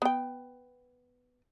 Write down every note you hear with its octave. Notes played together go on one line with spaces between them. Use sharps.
B3 G5